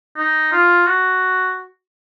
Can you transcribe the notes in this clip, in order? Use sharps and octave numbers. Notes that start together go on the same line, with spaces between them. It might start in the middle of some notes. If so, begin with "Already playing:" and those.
D#4
F4
F#4